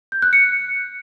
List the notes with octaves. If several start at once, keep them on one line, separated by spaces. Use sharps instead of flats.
G6
F#6
C#7